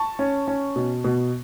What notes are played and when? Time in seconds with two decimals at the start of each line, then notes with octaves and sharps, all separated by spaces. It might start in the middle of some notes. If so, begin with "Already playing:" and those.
Already playing: A5 C#6
0.19 C#4
0.48 C#4
0.76 B2
1.04 B2